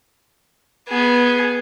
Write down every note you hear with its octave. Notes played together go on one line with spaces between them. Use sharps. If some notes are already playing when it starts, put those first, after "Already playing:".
B3 G#4